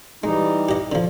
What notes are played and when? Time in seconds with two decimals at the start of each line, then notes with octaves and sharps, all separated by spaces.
0.24 E3 G3 G#3 D#4
0.69 G4 D#5
0.92 D3 F3